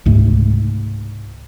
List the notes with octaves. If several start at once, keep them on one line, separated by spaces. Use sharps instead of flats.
C#2 G#2 C3 A3